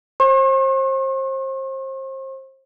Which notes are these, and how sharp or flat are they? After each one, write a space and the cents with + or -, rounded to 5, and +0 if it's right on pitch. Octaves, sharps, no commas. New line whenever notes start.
C5 +30 C#6 -45